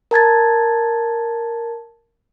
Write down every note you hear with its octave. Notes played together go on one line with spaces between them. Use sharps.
A#4 A5 G#6 A6